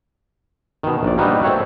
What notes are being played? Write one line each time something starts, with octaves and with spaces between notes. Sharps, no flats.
B2 D#3
A#1 D5
G3 A#3 D#4 F#4 B4 D#5
A3 C4 C#5 E5 F#5